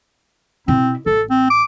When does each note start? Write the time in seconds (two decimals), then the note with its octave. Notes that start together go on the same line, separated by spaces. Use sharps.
0.68 B2 C4 E4
1.06 A1 A4
1.30 C4
1.50 D6